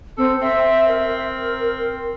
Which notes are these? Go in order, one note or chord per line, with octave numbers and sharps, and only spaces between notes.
C4 A4
C4 E5
A#4